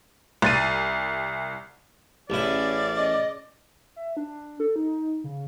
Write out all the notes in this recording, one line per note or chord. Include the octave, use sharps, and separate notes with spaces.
C2 A6 D#7
A1 C#4 E4 G#4 D5
D#5
E5
D4
A4
D#4
C#3